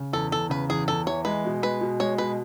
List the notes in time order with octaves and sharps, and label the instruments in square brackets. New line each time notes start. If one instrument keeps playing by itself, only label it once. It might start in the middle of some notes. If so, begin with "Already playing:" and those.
Already playing: [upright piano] C#3
[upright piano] E2 [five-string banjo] A4
[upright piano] E2 [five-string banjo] A4
[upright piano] C#3 [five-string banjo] B4
[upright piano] E2 [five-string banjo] G#4
[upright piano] E2 [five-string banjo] A4
[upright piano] E3 [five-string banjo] C#5
[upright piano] G#3 [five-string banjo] B4
[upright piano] B2
[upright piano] G#3 [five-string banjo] B4
[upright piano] B2
[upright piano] G#3 [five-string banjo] C#5
[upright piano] B2 [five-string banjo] B4